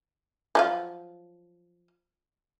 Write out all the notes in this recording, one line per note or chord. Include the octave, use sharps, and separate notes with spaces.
F3 F#3 F5